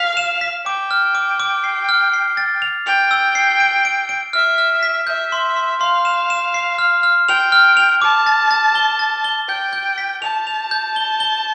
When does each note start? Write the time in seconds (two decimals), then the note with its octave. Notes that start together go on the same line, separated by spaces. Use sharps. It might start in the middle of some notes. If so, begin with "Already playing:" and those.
Already playing: F5 B6
0.17 E7
0.41 B6
0.66 G5 D6
0.91 F6
1.15 D6
1.40 D6
1.64 C7
1.89 F6
2.13 C7
2.37 A6
2.62 F7
2.86 G5 F7
3.11 E6
3.35 C7
3.60 D7
3.85 D7
4.09 D7
4.33 E5 F6
4.58 F6
4.83 B6
5.07 E5 G6
5.32 C6
5.56 C6
5.81 F5 C6
6.05 E7
6.30 E7
6.54 C7
6.78 F6
7.03 F6
7.28 G5 F7
7.52 F6
7.77 F7
8.02 A5 D6
8.26 A6
8.51 A6
8.75 G7
8.99 A6
9.24 G7
9.49 G5 G6
9.73 G6
9.98 B6
10.22 A5 F7
10.47 F7
10.71 G6
10.96 G7
11.20 G7